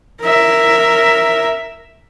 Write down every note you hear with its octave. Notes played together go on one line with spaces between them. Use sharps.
A#4 E5